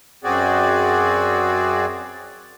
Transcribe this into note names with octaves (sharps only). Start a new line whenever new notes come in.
F#2 C4 F#4 G#4 D5